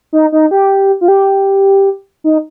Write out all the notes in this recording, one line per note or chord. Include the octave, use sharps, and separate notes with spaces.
D#4
D#4
G4
F4
G4
D#4